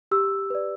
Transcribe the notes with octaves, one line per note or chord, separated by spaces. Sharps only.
G4 E6
B4 D5